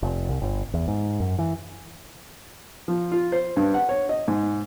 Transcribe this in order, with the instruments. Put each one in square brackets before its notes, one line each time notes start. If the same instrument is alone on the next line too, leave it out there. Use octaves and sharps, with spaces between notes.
[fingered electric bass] F1
C2
G1
E2
G#2
F#2
E3
[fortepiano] F3
F4
C5
G2
F#5
C#5
D#5
G#2